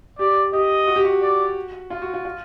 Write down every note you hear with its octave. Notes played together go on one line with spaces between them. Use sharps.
G4 D5
G4 D#5
F#4
G4
F#4
D5
F4
F#4
F4
F4